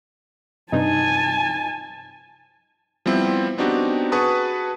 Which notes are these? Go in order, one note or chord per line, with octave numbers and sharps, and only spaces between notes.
G2 C3 D#4 G#5 A5
F3 G3 B3 C4 E4
B3 C4 D4 D#4 F#4 G4
F#4 G#4 B4 A5 C#6 D#6